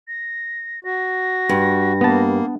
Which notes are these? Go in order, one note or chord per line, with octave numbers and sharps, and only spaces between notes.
A#6
F#4 A#6
G2
A#3 B3 A5